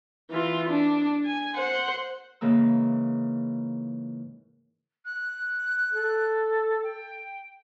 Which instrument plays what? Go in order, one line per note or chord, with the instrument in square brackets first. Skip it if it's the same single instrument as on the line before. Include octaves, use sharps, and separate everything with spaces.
[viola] E3 F4
D4
G#5
C5 F#5
[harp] G#2 C#3 E3 A#3 E6
[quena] F#6
[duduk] A4
[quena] G5